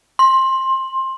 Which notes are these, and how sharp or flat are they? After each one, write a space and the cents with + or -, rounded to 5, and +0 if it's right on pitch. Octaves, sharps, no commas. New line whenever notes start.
C6 +20